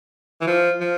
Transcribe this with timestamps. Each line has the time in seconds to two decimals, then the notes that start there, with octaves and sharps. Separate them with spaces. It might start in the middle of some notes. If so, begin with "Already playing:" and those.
0.41 E3
0.47 F3
0.81 F3